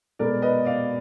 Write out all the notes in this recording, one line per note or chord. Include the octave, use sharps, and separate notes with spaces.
B2 G#3 B3 A#4 D5
B4 D#5
D5 F5